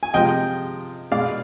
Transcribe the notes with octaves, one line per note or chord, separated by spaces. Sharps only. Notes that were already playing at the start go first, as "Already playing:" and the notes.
G#5
C3 F3 G#3 D#5 G5
B2 G#3 D5 F5